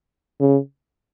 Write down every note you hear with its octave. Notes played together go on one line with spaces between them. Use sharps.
C#3